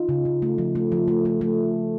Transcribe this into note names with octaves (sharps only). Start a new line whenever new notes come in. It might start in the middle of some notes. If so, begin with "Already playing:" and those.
Already playing: D#4 F4
C#3
C#3
A3
F3
A3
F3
A3
A3
A3